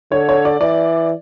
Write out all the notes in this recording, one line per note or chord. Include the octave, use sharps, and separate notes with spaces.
D3 C#5
C#5
D5
E3 D5